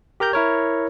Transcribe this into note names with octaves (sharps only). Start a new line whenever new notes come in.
G4 A#4 A#5 G6
E4 A#4 C#5